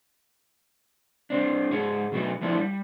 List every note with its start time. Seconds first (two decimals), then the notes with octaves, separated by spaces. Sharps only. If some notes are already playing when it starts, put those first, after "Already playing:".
1.30 G3 C4 D4
1.71 G#2 G#4 C#5
2.12 B2 F#3 A3 B3 F#4
2.41 F3 A3 B3 D4 E4
2.58 G3